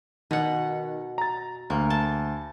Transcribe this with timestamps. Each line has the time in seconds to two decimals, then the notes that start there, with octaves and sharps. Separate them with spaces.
0.31 B2 D#3 F#5
1.18 A#5 A6
1.70 D2 A#3
1.90 A5